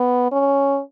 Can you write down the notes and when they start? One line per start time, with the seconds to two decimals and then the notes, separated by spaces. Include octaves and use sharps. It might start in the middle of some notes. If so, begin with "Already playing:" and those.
Already playing: B3
0.32 C#4